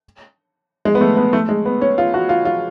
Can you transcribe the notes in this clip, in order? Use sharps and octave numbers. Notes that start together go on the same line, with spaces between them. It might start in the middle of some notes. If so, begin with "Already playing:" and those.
G#3
B3
A3
B3
A3
G#3
B3
C#4
F4
F#4
F4
F4